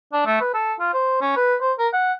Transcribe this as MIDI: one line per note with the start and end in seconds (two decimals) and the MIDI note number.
0.13 0.22 62
0.26 0.40 57
0.41 0.53 71
0.54 0.73 69
0.79 0.89 65
0.94 1.18 72
1.21 1.35 61
1.36 1.55 71
1.61 1.73 72
1.79 1.88 70
1.93 2.13 78